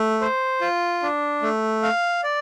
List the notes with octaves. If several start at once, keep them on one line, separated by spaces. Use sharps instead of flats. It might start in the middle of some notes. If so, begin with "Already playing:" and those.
Already playing: A3
C5
F4
D4
A3
F5
D5